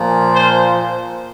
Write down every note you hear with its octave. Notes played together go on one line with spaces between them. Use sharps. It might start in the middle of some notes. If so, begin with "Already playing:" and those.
Already playing: A#2 F3
C5